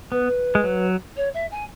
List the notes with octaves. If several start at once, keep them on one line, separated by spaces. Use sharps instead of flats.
B3 B4
G#3
F#3
C#5
E5
G#5